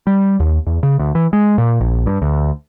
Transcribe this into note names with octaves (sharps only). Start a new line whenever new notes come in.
G3
D#2
E2
C#3
D2
E3
G#3
A#2
A#1
G2
D2